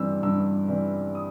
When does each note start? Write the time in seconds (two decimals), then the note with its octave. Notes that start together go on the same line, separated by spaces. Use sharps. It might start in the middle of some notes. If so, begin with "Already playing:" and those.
Already playing: G2 E3 G3 C4 E6
0.23 G2 E6
0.68 E3 G3 C4
1.15 D#6